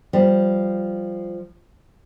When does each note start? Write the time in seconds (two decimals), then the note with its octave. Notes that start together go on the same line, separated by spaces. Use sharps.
0.13 F3 G3